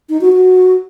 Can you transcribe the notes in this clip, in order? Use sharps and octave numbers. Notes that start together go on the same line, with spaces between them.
D#4
F#4
F#4